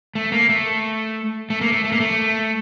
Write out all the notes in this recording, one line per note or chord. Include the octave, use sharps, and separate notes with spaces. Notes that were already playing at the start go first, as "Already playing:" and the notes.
A3
A#3
A3
A3
A#3
A3
A3
A#3
A3